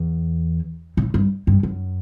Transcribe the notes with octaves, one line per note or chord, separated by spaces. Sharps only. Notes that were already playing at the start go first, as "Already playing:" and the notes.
Already playing: E2
A2
G2
G2
F#2